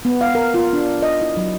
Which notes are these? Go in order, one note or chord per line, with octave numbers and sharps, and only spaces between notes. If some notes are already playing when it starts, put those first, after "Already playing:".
B3
F5
A#4
F4
D4
D#5
E4
F#3